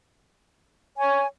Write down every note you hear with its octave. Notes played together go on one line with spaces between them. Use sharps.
C#5 G#5